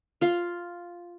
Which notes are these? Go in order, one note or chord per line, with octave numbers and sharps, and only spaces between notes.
F4 F5